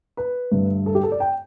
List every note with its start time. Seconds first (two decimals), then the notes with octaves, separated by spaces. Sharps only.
0.17 B4
0.52 G2 D3 A3
0.86 A4
0.95 G4
1.03 A4
1.12 D5
1.20 G5